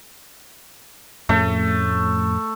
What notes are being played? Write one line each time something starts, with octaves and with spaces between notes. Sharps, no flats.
F2 A2 A3 C#4